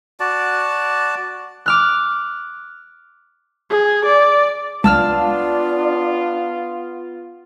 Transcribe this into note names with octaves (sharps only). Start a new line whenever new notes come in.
F#4 D5 A5
D6 F6 F#6
G#4
D5
C#2 B3 D4 F4 A5 E6 F6